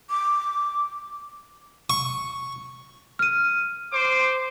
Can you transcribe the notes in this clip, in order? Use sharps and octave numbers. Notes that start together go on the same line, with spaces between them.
D6
C#6
F6 D#7
C5 C6 D6